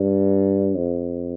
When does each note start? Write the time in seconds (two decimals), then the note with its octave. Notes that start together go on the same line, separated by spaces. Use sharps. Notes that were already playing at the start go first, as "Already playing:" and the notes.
Already playing: G2
0.75 F2